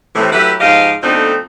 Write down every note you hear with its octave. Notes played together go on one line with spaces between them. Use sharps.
A2 C3 E3
F#3 A3 E4 G4 B4
G#2 F3 G4 D#5 F5
F2 B2 A3 C4 D4 D#4